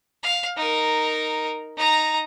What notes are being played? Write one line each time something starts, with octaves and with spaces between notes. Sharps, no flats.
F5
D#4 A#4
D#4 A#5